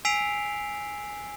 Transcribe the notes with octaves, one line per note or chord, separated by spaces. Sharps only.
G#5 E6 B6 C7 D7 F7